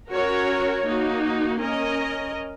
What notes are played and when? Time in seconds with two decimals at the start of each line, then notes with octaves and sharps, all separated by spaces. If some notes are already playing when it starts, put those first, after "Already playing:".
0.10 C#4 F#4 A#4 C#5
0.84 A#3 D#4 F#4
1.58 C#4 A#4 D#5